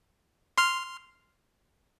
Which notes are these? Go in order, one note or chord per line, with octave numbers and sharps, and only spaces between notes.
C6 F6